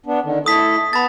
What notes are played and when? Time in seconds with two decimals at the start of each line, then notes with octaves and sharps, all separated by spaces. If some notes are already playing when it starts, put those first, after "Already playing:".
0.06 B3 D4
0.23 D3 D#3
0.46 A3 E4 A4 D#6 B6
0.93 B3 A5 B5 A6